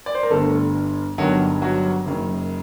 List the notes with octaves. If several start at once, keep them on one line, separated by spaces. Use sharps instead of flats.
D5
C5
A#4
G1 G2 D3 A3 A4
G1 G2 D#3 F#3 F#4
F#3 F#4
F#1 F#2 D#3